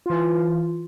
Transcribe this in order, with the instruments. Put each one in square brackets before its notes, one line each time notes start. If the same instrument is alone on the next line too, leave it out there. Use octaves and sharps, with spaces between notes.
[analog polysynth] E3 F4